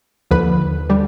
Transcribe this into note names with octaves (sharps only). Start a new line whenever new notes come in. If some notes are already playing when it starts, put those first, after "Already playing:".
D#2 D3 F3 B4
D3 G3